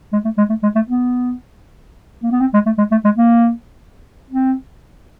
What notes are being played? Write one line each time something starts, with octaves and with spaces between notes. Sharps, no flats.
G#3
A3
G#3
A3
G#3
A3
B3
A#3
B3
C4
G#3
A3
G#3
A3
G#3
A#3
C4